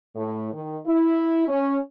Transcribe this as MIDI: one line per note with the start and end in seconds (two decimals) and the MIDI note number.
0.16 0.49 45
0.53 0.78 51
0.86 1.45 64
1.48 1.78 61